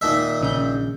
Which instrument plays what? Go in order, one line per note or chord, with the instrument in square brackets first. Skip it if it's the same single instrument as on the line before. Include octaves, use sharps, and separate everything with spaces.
[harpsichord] A#2 D#3 E5
[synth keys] A#1 C#3 G6